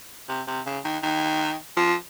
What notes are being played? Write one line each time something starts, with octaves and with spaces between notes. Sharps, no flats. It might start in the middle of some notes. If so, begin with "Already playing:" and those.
C3
C3
C#3
D#3
D#3
F3